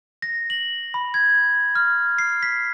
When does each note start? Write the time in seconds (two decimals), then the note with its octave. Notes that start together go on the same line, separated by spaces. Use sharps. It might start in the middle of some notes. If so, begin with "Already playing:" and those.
0.22 A#6
0.50 F#7
0.94 B5
1.14 G#6
1.75 F6
2.18 C7
2.43 B6